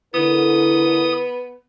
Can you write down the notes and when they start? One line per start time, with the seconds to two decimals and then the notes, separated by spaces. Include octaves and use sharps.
0.14 D3 B3 E4 A#4 D#6